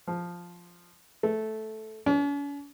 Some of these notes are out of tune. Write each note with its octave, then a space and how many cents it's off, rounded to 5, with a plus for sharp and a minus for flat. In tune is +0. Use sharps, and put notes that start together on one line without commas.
F3 +0
A3 -10
C#4 +45